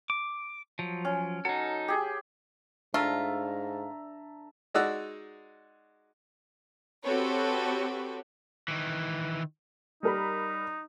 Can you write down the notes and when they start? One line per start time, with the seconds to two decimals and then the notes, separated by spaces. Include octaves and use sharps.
0.10 D6
0.79 F3 F#3
1.05 C#4
1.45 F#3 D#4 A4
1.88 G4 G#4
2.94 G#2 A3 D4 F4 A4 E5 A#5
4.74 G#3 D#4 F#4 D5 E6 F#6
7.04 C4 F#4 G4 A4 B4 C#5
8.68 D#3 E3
10.03 G3 D#4 A#4 B5